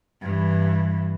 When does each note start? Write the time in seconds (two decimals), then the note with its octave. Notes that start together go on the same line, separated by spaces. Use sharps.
0.21 G2 E3